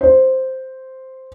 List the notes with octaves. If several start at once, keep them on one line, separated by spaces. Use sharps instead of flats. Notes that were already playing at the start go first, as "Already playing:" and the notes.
C5